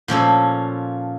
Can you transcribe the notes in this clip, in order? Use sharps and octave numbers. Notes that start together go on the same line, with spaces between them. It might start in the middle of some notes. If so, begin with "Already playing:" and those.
A#2 F3 C#4 A4